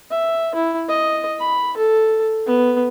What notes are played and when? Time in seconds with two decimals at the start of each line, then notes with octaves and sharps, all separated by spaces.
0.11 E5
0.55 E4
0.88 D#5
1.39 B5
1.77 A4
2.46 B3